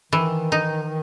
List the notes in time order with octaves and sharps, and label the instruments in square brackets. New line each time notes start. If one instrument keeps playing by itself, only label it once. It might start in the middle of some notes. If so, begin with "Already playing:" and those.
[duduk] D#3 [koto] E3
[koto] D#4